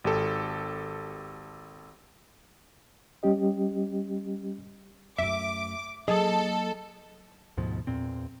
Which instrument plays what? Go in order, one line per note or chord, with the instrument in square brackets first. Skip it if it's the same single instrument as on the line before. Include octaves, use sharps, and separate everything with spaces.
[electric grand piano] G#1 G4 A4
[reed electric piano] G3 C#4 G4 D#5
[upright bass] F#2 A3 [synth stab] E5 [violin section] D6
[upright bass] F#3 A#3 [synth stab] G#4 [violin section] A4 [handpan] D#5
[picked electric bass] D2 G#2 B2 F3
E2 A#2 C4